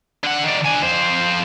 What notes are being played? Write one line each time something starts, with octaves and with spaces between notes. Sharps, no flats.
D3 F#5
D#3 D5
D4 G#5
F2 C5